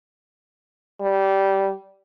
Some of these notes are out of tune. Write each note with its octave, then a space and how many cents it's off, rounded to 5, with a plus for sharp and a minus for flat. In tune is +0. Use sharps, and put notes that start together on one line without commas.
G3 -15